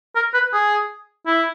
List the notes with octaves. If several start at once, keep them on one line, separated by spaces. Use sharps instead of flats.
A#4
B4
G#4
E4